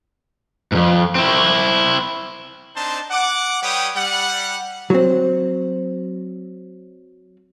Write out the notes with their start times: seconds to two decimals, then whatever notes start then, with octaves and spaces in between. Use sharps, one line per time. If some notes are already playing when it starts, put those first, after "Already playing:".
0.72 F2 G#2
1.15 C4 E4
2.76 C4 D4 D#4 C5 A5
3.11 F#5 D6
3.63 G3 G4 B4 C#5 G5 D#6
3.94 G3 F#5
4.90 F#3 C4